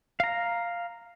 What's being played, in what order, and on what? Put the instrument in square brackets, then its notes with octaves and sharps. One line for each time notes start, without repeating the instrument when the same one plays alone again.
[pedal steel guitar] F5 A#5